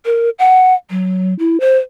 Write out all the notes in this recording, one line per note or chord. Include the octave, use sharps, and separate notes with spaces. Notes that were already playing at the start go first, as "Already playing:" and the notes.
A#4
F#5
F#3
E4
C5